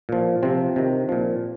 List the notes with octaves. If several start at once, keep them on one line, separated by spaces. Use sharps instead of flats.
A#2 F3
C3 F3 C4
C3 D#3
A#2 F3